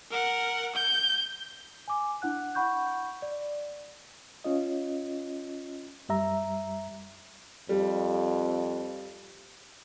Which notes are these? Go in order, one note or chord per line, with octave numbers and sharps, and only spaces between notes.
A#4 F#5
G6
G#5 D6
D4 E4 F#5 F#6
F#5 B5 C#6 G6
D5
C#4 F4 D#5
F#2 G3 E5 A#5
F2 G3